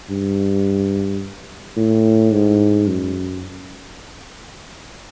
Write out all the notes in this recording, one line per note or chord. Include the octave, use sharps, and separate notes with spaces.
G2
A2
G#2
F#2